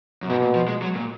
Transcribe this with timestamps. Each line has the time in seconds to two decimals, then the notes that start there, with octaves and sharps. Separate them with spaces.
0.23 F#2
0.29 G#2 B2
0.42 A#2
0.55 F3
0.68 G#3
0.82 F#3
0.95 A#2